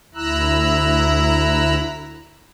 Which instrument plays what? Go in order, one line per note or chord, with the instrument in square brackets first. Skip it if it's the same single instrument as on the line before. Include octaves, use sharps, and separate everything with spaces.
[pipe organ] D2 E4 A#5 E6 F#6